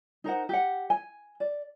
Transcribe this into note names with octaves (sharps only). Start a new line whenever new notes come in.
D#4 A#4 C5 F#5
G4 F#5
G#5
D5